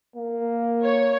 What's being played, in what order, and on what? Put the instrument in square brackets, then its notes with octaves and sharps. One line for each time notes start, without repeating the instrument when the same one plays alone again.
[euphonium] A#3
[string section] C#5